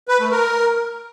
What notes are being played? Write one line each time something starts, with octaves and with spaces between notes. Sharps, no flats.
B4
A3
A#4